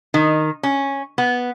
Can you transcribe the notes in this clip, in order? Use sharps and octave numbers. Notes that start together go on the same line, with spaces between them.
D#3
C#4
B3